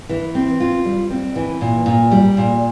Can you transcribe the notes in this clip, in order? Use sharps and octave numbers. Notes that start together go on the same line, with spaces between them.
E3
C4
F4
G3
C4
E3
A#2
A#2
G3
A#2